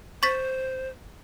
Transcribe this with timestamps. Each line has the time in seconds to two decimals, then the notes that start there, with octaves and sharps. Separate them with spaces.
0.23 C5 C#6 A6 B6